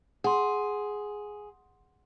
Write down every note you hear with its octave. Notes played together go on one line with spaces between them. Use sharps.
G#4 F#5 C6